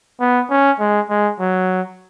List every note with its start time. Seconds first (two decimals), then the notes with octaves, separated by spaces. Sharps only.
0.21 B3
0.51 C#4
0.80 G#3
1.10 G#3
1.40 F#3